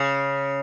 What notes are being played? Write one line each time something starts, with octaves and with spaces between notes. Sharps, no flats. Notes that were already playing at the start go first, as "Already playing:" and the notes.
Already playing: C#3